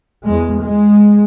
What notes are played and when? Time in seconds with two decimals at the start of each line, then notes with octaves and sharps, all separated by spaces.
0.24 E2 G#3
0.61 G#3